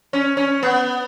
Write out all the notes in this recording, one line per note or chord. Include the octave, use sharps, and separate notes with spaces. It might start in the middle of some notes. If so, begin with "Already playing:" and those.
C#4
C#4
B3